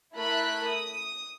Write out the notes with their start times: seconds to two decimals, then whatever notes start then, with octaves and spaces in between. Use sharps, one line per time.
0.15 A3 E4 A#4 B5 F#6
0.67 D#6